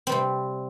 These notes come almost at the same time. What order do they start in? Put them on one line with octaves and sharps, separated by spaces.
C4 G3 C3